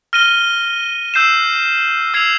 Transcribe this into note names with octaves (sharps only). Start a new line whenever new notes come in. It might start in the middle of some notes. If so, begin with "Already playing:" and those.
F6 A#6 D#7 G7
E6 G6 C7 E7
E6 G#6 C7 F7